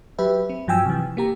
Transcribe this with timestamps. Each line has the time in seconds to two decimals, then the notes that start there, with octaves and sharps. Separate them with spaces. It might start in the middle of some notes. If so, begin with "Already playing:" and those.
0.19 F#3 G4 B4 E5
0.49 C4
0.67 G2 F3 F#3 G5 G#5 E6
0.85 C3 E3
1.17 A#3 G4 A#5